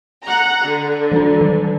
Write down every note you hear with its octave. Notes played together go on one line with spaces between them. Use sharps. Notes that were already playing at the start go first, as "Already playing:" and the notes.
F#5 A#5
D3
E3 D4
D#3